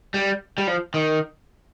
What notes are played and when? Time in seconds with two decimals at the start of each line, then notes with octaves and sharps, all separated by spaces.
0.14 G3
0.58 G3
0.67 F3
0.94 D#3